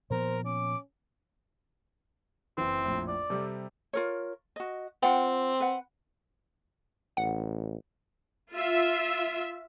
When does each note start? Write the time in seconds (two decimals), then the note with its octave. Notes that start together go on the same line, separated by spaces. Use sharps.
0.10 A#2 F3 B3 A#4 C5
0.45 C#4 D6
2.58 F#1 E3 C4
2.83 A#1 F2 A2
3.08 D5
3.30 C3 G3 A4
3.93 F4 A#4 C#5
4.56 F#4 D#5
5.03 C4 F4 F#5 G5
5.60 B4 F#5
7.17 A1 F#5
8.52 F4 E5